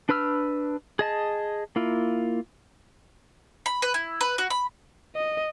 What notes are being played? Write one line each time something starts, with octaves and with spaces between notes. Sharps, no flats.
D4 B4 B5 E6 F6
G#4 D#5 A5
A#3 E4 F4
B5
B4
E4
B4
F#4
B5
D#5